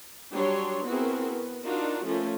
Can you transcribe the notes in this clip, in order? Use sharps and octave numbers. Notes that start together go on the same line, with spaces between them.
F#3 G3 D4 C#5 C6
B3 C4 E4 F#4 G#4 A#4
B3
D4 D#4 F4 F#4 A#4
F3 A3 C#4 F4